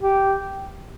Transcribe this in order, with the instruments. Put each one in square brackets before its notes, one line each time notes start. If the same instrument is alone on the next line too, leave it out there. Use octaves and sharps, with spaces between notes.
[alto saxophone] G4